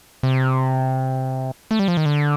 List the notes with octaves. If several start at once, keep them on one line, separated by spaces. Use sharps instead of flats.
C3
A3
G3
F3
D#3
D3